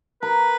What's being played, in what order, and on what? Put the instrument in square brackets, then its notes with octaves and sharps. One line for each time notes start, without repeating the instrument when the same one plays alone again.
[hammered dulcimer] A#4 [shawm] B4